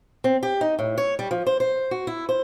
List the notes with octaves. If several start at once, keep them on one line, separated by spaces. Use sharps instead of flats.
C4
G4
D#4
A2
C#5
G3
F3
C5
C5
F#4
E4
C5